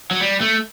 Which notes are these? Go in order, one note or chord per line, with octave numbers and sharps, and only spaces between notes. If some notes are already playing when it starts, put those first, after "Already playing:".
F#3
G3
A3